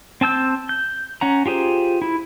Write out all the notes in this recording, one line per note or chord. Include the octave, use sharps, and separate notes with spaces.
C4 A5 E6 G6
G6
C#4 F#5 A#5
F4 G4 G#4 C5
E4